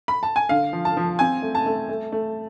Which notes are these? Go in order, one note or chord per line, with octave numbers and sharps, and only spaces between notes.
B5
A5
G#5
D3 F5
F3
A5
F3
C4 G#5
A3
A5
A3
A3
A3